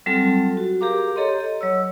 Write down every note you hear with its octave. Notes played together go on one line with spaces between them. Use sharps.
F#3 G3 C4 F4 A4 A5
F#4
G4 G#4 A#4 F5 A#5 D6
G4 A4 C#5 D#5 A#5 C6
D#5
F#3 C#5 E6